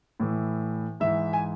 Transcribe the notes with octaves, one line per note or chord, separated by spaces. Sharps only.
A2 E3
G#2 E3 E5
G#5